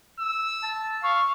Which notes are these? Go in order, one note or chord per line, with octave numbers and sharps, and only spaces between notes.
E6
A5
F5 C#6